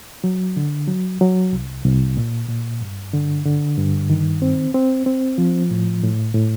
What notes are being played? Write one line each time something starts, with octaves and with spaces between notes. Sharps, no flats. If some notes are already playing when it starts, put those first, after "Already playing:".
F#3
D3
F#3
F#3
C2
C2
A#2
A#2
G2
D3
D3
G2
D#3
C4
C4
C4
F3
A2
A2
A2